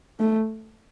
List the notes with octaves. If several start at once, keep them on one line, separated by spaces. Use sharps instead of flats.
A3